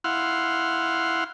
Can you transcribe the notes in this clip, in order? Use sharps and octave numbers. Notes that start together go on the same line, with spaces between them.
E4 F5 F#5 C6